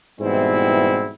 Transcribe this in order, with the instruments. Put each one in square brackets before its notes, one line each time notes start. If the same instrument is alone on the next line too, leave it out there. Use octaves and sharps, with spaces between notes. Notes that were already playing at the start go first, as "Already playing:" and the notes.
[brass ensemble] G#2 B2 E3 G3 C4 E4